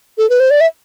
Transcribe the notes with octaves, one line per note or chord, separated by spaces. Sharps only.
A4
B4
C5
D5
E5